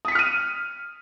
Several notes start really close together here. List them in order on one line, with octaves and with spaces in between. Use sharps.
D#6 B6 C#7 F6 D#7